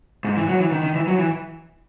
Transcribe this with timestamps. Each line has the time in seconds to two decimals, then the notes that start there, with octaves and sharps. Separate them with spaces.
0.25 G#2
0.37 E3
0.48 F#3
0.60 E3
0.72 D#3
0.83 D#3
0.95 E3
1.07 F#3
1.19 E3